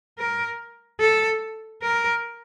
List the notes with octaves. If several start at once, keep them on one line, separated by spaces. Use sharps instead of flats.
A#4
A4
A#4